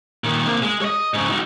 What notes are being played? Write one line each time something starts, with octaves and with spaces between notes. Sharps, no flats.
A#2 D#3
C3 A#3
G#3
C#5 D#5
G#2 C#3
D#4 F#4